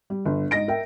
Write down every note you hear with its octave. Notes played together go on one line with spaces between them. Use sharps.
G3
G1
G#2 D#5 A#6 D7
A#4 E5 G5